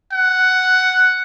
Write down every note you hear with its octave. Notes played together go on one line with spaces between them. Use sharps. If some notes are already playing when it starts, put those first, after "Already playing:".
F#5